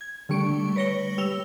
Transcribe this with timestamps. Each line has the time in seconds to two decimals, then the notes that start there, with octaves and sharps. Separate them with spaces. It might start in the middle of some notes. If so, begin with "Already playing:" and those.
0.01 G#6
0.29 D3 G3 A3 C#6 D7
0.76 B4 C#5 A#6 C#7 G7
1.18 G3 E6 F7 G7